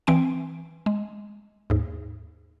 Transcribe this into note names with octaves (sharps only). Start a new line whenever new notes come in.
E3 C4 G#5 D7
G#3
D#2 G#2